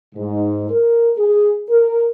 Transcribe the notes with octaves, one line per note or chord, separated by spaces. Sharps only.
G#2
A#4
G#4
A#4